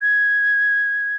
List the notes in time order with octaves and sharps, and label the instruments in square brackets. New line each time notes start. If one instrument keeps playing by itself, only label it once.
[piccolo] G#6